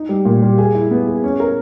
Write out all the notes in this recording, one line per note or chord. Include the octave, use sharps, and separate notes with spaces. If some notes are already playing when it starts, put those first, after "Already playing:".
Already playing: D#4
G3
A#2
G3
G#4
E4
B3
G#4
C#4
A#4